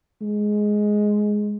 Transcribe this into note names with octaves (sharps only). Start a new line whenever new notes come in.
G#3